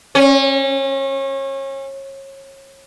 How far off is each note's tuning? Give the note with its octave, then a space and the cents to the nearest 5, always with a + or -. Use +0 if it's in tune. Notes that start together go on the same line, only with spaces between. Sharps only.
C#4 -30